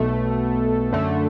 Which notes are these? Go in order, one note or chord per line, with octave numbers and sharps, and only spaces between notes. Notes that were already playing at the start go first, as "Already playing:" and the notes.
Already playing: B1 B2 A3
F#2 D3 A3